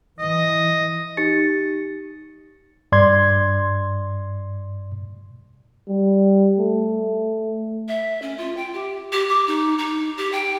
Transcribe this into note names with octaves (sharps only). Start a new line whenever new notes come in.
E3 D#5
D#4 G4 A6 C#7
G2 D5 C6 G#6
G3
A3
E5
C#4
F4
G5
G4
G4
D6
D#4
D#4
G4
G5